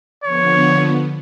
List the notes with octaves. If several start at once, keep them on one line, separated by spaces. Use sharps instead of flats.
D3 F3 B3 C#5